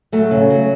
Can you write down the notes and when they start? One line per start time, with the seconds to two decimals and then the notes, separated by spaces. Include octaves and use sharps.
0.12 F#3 A3
0.31 C#3
0.50 F#3 A3